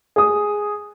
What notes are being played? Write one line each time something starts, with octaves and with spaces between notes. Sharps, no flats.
G#4 D#6